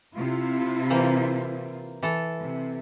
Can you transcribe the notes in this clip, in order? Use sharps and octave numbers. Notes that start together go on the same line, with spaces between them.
C3 E4 F4
E3 A#3 C5
E3 A4
C3